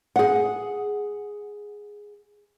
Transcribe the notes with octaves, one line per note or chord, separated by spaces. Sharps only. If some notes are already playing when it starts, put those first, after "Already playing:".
G#4 F#5